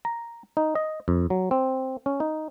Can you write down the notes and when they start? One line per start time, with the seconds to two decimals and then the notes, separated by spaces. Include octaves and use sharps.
0.05 A#5
0.57 D#4
0.75 D#5
1.08 F2
1.30 F#3
1.51 C4
2.06 C#4
2.20 D#4